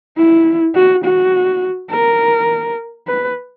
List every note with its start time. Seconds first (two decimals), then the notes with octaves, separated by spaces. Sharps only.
0.17 E4
0.75 F#4
1.04 F#4
1.91 A#4
3.07 B4